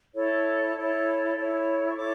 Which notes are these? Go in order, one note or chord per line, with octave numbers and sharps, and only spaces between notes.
E4 A4 C#5
E4 A4 C#5
E4 A4 C#5
C#6
E4 A4 C#5 D6